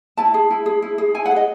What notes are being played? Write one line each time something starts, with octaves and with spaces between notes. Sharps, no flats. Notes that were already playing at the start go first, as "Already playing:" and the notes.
E4 A5
G#4
E4
G#4
E4
G#4
E4 G#5
F#5
G#4
D#5